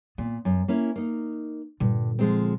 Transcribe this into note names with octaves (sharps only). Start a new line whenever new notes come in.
A#2 B3
F#2
A#3 C#4 E4
A#3 D#4
G2 A#2 D3
F3 G#3 C4